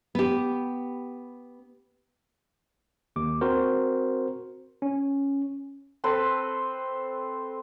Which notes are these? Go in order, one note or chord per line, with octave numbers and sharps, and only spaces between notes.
B3 G4
D#2 D6
C4 F#4 A#4 C5
C#4
C4 A4 B4 C5